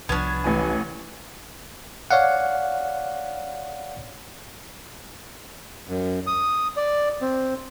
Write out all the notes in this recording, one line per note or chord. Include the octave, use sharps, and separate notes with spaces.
C2 F3 B3 C#4 D4 G#6
A1 E3 G#5
C#5 D5 F5 F#5
F#2
D#6
D5
C4